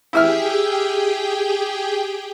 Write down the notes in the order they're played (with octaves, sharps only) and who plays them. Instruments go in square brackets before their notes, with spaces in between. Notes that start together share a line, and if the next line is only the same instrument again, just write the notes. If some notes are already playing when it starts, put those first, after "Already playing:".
[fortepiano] E4 E5 F6 [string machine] G4 G#4 G5